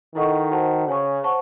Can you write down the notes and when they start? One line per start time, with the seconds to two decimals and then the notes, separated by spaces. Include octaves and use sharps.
0.15 D#3 E4 A4 D#5 F#5 C#6
0.51 F#4 C5 F#5 A5
0.88 C#3 C#5 G#5 C#6
1.23 C5 F#5 A5 C#6